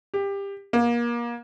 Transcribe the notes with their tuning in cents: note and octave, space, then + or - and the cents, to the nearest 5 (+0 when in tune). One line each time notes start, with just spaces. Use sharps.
G4 +20
A#3 +30